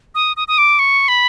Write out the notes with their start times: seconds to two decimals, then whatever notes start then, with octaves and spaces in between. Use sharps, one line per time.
0.15 D#6
0.37 D#6
0.48 D#6
0.58 D6
0.79 C#6
1.08 B5